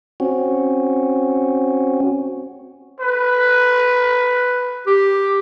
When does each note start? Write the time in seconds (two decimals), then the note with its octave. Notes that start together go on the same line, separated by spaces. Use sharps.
0.20 C4 C#4 F#4
3.00 B4
4.87 G4